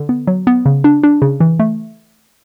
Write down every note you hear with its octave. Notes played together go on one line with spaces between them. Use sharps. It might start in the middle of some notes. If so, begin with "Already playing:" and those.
Already playing: D3
B3
F#3
B3
C#3
D4
D4
C#3
E3
A3